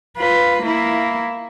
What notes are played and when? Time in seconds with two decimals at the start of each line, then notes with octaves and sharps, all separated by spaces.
0.17 F4 B4
0.63 A#3 E4